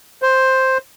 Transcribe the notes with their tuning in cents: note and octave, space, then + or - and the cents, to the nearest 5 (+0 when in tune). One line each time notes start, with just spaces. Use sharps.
C5 +5